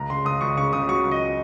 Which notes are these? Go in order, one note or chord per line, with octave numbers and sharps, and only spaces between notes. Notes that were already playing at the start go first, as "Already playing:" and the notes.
Already playing: C#2 A#5
C#3 C6
C#2 D#6
C#2 C#6
C#3 C#6
C#3 D#6
F#3 C#6
C#2
D#5